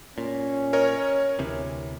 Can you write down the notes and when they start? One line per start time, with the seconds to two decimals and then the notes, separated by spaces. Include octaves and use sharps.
0.18 A#2 C#4
0.73 A#4 C#5 D#5
1.39 D2 C3 E3